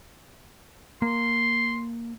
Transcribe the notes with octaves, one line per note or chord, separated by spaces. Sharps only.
A#3 C6